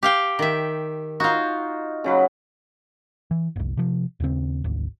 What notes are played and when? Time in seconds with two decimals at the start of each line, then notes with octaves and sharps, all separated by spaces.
0.03 G4 F5 G5
0.39 D#3 E5
1.20 D#4 F4 F#4
2.04 C#3 F#3 B4
3.31 E3
3.56 F#1 C2
3.77 C3 F3
4.20 D#2 C#3 C4
4.64 G#1 D2